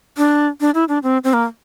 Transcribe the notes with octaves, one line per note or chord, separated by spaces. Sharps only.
D4
D4
E4
D4
C4
C4
A#3